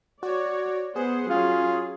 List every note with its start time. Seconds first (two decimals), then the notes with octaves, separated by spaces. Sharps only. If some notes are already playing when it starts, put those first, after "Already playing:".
0.23 F#4 C#5 D5
0.96 B3 G#4 C5 F#5
1.30 F#3 C#4 F4